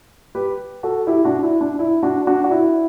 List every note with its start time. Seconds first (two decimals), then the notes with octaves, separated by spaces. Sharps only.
0.35 G4 B4
0.83 F#4 A4
1.07 E4 G4
1.25 D4 F#4
1.43 E4
1.61 D4
1.79 E4
2.03 D4 F#4
2.27 D4 F#4
2.44 F#4
2.51 E4